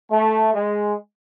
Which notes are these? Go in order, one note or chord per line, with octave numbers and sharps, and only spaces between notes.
A3
G#3